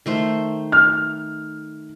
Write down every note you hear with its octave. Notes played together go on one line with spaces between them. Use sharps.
D#3 A3 C5
F6